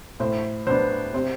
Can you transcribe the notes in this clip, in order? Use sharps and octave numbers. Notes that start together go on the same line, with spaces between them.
A2 C5
F#3 B3 D4 C5
C3 C5